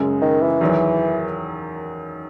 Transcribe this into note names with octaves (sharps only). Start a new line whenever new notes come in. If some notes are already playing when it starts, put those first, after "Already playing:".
Already playing: F#2 C#3 G#3
D#3
E3
E2 D#3 F#3